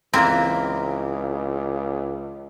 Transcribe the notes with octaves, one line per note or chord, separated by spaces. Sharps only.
C#2 E3 A#3 C4 E4 A#5